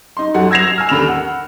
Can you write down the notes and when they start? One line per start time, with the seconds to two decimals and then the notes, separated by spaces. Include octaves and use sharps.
0.17 D#4 C6
0.34 F#2 F#4 A4 F#5
0.51 E6 G#6 A#6 C7 F7
0.78 G#5 E6 F6
0.89 D#2 D3 B5 F7
1.08 F#5